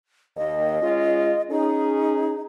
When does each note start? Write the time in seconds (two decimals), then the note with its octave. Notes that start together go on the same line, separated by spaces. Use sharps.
0.37 D#2 D#5
0.82 G#3 C#4 F4
1.50 C#4 D#4 G#4